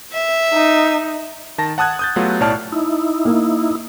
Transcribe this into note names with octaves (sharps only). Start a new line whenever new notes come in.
E5
D#4
D#3 A5 A#6
F#5 A5 D#6 F#6 G#6
D#6 G6 A6
F#3 A3 B3 F4 G4
B1 A2 C#5 D5 A5 F6
D#4 E4
A#3